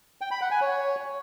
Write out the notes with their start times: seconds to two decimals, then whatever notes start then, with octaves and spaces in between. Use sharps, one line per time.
0.21 G5
0.31 B5
0.41 F#5
0.51 G#5
0.61 C#5